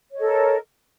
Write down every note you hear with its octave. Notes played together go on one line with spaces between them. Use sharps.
A4 A#4 C#5 D#5